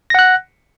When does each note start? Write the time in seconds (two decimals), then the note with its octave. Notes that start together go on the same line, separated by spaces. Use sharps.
0.10 A#6
0.15 F#5
0.19 F#6